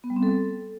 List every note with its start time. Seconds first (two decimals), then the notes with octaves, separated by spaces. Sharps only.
0.04 B3
0.10 G3
0.16 C4
0.23 A4